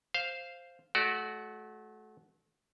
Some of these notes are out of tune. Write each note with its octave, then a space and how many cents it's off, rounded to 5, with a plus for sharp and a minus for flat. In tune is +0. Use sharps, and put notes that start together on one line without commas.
C5 +0 F5 -5
A3 -30 F#4 +0 D5 +0